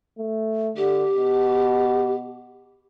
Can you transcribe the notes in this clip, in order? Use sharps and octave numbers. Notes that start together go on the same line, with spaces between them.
A3
D3 G4
B2